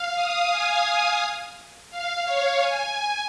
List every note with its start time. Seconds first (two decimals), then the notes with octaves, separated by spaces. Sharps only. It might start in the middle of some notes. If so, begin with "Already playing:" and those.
Already playing: F5
0.15 D#6
0.51 G#5
1.91 F5
2.26 C#5
2.61 G#5